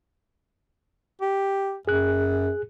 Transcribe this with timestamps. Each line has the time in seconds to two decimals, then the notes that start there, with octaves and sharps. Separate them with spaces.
1.21 G4
1.88 F#2 G#4 F#6